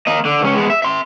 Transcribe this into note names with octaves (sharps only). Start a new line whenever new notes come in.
A#3 D#5
D3
C#2 C#4
G#3 B3
E5
E5 C6